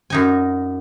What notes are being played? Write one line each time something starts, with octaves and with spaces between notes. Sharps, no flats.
F#2 D#4 G#5